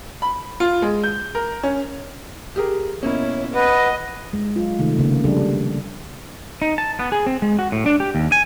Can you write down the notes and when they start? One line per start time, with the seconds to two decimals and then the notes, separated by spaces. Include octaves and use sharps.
0.22 B5
0.60 F4
0.82 G#3
1.04 G6
1.35 A#4
1.63 C#4
2.56 G4 G#4 A#4
3.03 B2 A#3 C#4 E4 C#5
3.55 B4 D#5 F#5
4.33 G#3
4.56 F#3 F4
4.79 C3 D#3 A3
4.99 C#3 A#3
5.24 F3 G3 D4 G#4 A4
6.62 D#4
6.78 A5
6.99 B3
7.12 G#4
7.26 C4
7.42 G#3
7.59 F#4
7.72 A2
7.86 D4
8.00 G4
8.15 D#2
8.32 G#5